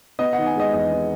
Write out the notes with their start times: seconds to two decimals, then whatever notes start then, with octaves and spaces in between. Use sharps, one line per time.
0.19 B3 D#5
0.33 D#3 F#5
0.46 G#5
0.55 G#3 D#5
0.73 E2 D#5
0.92 B3